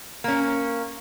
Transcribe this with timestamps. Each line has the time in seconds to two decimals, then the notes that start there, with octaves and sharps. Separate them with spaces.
0.24 A#3 C#4